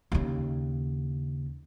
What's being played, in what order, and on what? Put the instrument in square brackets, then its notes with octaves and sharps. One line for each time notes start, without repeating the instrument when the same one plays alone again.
[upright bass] D#2 C#3